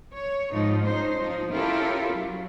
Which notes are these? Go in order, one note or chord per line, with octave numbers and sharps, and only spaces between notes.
C#5
G#2 F3 D#4
C#4 D#4 C5
F3 D#4
C#4 E4 F4 G4 A4 A#4
F#3